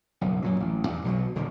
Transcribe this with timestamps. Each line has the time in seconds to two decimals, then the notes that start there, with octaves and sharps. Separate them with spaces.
0.21 F#1 B1
0.42 F#2 A#2 F#3
0.60 A1
0.88 E2 G2
1.04 B1 B2 F3 F#3
1.35 D#1 D3 D#3